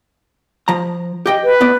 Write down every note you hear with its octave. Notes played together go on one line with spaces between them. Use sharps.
F3 A#5
G4 D#5 G5
B4
A2 B3 D5